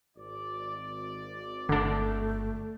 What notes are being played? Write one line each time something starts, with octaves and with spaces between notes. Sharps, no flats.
G#1 D5
G1 D3 A3 D4